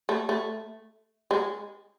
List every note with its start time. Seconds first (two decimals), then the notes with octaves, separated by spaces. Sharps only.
0.09 A3
0.29 A3
1.31 G#3